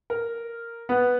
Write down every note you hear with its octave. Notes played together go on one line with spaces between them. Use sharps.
A#4
B3 B4